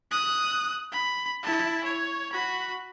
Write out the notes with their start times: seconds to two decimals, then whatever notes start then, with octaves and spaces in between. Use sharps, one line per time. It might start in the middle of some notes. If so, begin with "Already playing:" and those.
0.11 D#6 F#6
0.92 B5
1.43 E4 A5
1.84 C#5
2.33 F#4 B5